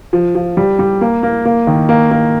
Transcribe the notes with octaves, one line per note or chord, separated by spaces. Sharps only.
F3
F3
G3
G3
A#3
A#3
A#3
D#3
A#3
A#3